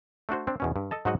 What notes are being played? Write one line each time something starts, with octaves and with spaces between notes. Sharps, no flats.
A3 D4 F#4 C5
C4 D4
E2 B2 C#4
G2
A4 D#5 A5
G#2 F#3 D#4 F#4 D#5 F#5